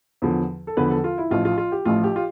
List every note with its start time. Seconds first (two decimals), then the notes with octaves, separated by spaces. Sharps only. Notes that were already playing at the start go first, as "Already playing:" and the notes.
0.22 E2 D3 F3
0.67 A4
0.77 E2 D3 F3 B4
0.90 A4
1.04 F4
1.18 E4
1.31 A1 A2 F3 F4
1.45 F4
1.58 F4
1.72 G4
1.85 A1 A2 F3 F4
2.04 G4
2.16 F4